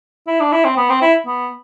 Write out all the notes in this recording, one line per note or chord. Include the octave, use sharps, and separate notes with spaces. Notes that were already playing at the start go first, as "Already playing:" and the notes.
E4
D4
E4
C4
B3
C4
E4
B3